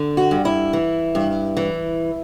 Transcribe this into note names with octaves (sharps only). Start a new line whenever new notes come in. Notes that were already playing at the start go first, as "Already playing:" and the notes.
Already playing: D3
F#4
G2
E4
E3
G2
E3